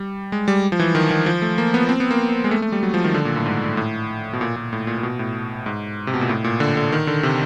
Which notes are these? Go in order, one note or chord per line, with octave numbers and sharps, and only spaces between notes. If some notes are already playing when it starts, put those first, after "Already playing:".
Already playing: G3
G#3
G3
F3
E3
D#3
D#3
F3
A3
A#3
B3
C4
B3
A#3
G#3
A3
A3
G3
F#3
F3
D#3
D3
A#2
A2
G#2
A2
B2
A#2
A#2
A2
A#2
A#2
B2
A2
G#2
C3
B2
A#2
A2
A#2
D3
D3
D#3
D3
C3